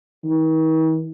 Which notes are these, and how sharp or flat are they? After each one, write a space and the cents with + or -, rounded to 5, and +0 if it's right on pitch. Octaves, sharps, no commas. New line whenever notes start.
D#3 +45